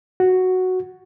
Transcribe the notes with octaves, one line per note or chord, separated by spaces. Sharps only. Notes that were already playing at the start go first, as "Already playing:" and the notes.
F#4